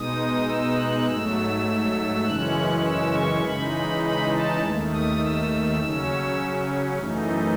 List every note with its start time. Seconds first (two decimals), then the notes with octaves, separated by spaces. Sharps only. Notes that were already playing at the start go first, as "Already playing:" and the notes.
Already playing: B2 G#3 D#4 D#6
0.47 E6
0.77 F#6
1.07 G#2 F#3 A3 E6
2.25 F#2 C#3 E3 G#3 C#4 F#6
2.85 E6
3.13 C#6
3.43 C#3 E3 G#3 D#4 B5
4.02 B5
4.32 A5
4.61 D#2 D#3 A3
4.91 D#6
5.20 E6
5.80 C#3 F#3 C#4
6.99 F#2 E3 A3 D#4